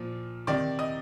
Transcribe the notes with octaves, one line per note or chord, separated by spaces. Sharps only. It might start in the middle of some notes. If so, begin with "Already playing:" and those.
Already playing: A#2 F3
C3 D#3 D5 D6
D#5 D#6